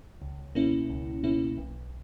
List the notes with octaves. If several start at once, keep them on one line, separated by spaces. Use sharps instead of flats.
C#2
B2 A#3 C#4 E4
C#2
B2 A#3 C#4 E4
B1